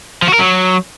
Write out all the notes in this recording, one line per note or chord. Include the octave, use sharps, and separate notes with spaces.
F3
F#4
A#4
F#3